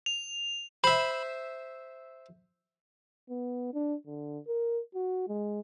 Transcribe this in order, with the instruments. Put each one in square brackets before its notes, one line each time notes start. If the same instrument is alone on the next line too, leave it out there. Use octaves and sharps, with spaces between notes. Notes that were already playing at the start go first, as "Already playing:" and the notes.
[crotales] F7
[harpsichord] C5 E5 [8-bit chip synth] B5
[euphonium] B3
D4
D3
A#4
F#4
G#3